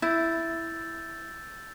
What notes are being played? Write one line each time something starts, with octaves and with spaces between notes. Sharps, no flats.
E4 E6 G6 A6